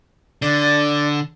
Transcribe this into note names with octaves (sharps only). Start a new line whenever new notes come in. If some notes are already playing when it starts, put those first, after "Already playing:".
D3 D5